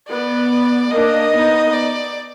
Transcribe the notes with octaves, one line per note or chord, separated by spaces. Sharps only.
B3 D5
A#3 D4 D#5
B3 D#4
D5